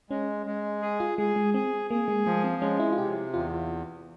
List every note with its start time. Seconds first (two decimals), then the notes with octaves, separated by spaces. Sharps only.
0.10 G#3 C#4
0.46 G#3
0.82 G#4
1.00 F4
1.18 G#3 G#4
1.36 G#3
1.54 C4 G#4
1.90 A#3 G#4
2.08 G#3
2.26 F3 G#3
2.44 C4
2.62 G#3 C#4
2.80 E4
2.93 F4
2.98 C3 G4
3.34 E2 F4